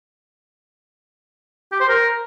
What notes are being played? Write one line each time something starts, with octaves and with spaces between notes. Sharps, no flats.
G4
C5
A#4